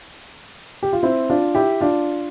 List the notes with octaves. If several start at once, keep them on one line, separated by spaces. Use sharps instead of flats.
G4
F4
C4 E4
D4 F4
E4 G4
D4 F4